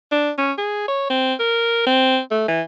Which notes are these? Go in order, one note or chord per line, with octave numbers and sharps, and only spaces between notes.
D4
C#4
G#4
C#5
C4
A#4
C4
A3
E3